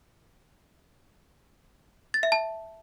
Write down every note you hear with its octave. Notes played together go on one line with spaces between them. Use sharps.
A6
E5
A5